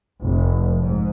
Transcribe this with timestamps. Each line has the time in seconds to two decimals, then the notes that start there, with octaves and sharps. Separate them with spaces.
0.22 F1
0.79 G#2